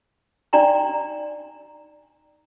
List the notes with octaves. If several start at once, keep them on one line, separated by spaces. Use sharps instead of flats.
D4 D#4 D5 G5 A#5 C6